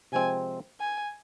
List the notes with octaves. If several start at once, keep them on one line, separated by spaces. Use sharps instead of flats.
C3 F3 G#3 C4 G#5
G#5